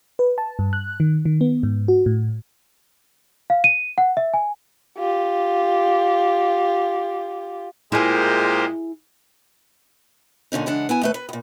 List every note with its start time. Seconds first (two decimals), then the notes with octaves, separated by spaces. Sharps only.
0.19 B4
0.38 A5
0.59 G2
0.73 F#6
1.00 D#3
1.25 D#3
1.41 B3
1.63 G#2
1.88 F#4
2.06 A2
3.50 F5
3.64 D#7
3.98 F#5
4.17 E5
4.34 G#5
4.98 F4 G4
7.92 A#2 G#3 E4 G4 G#4 A#4 C5
10.52 A#2 D3 C#4 D#4
10.66 C#3 E3 G#3 D4 F#5
10.89 B3 E4 G#5
11.02 D#2 A3 B4
11.14 B4
11.29 D#2 A#2